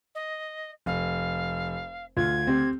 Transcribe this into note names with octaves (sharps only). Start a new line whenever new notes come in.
D#5
F1 F5
D2 F4 G#6
C4 G4